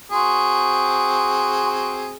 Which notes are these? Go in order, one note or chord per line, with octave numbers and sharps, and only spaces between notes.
C4 F#4 G#4